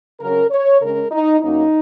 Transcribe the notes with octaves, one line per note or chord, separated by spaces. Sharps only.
C#3 F#3 C#4 A#4
C#5
C#3 G#3 C#4 A#4
D#4
F#2 F#3 A#3 C#4 D#4